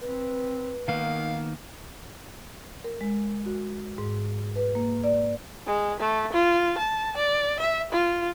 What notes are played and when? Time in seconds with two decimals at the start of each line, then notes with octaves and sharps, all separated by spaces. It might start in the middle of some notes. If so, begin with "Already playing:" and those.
0.01 C4 B4
0.88 D#3 A#3 B3 D#4 F5
2.84 A#4
3.01 G#3
3.46 F#4
3.98 G#2
4.56 B4
4.75 A#3
5.04 D5
5.67 G#3
6.00 A3
6.33 F4
6.78 A5
7.17 D5
7.60 E5
7.92 F4